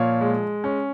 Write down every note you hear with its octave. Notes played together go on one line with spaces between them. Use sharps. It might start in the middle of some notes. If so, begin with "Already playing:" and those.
Already playing: A#2 F3 C#5 F5
G#3
C#4